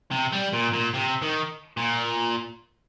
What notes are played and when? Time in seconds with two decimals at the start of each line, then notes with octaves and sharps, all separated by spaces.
0.11 C3
0.33 G3
0.54 A#2
0.74 A#2
0.94 C3
1.22 D#3
1.77 A#2